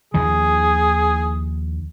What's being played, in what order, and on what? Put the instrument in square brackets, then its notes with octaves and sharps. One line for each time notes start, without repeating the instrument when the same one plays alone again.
[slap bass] D#2 D#3 F3 [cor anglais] G#4